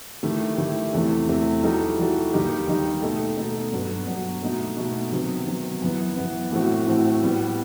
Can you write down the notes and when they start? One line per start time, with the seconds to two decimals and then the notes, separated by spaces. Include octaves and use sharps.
0.23 D#3 A3 E4 G4
0.58 D#3 A3 E4 G4
0.93 E2 C3 E3 A3
1.28 E2 C3 E3 A3
1.63 E3 G3 D#4 F#4 A4
1.98 E3 G3 D#4 F#4 A4
2.33 D#2 D#3 G3 D#4 G4
2.67 D#2 D#3 G3 D#4 G4
3.02 B2 A3 D#4 A4
3.37 B2 A3 D#4 A4
3.72 G2 F#3 B3 F#4
4.07 G2 F#3 B3 F#4
4.43 B2 A3 D#4 F#4
4.77 B2 A3 D#4 F#4
5.12 C3 D#3 F#3 B3
5.47 C3 D#3 F#3 B3
5.82 F#2 E3 B3
6.17 F#2 E3 B3
6.51 A2 E3 A3 C4 F#4
6.86 A2 E3 A3 C4 F#4
7.22 A2 G3 B3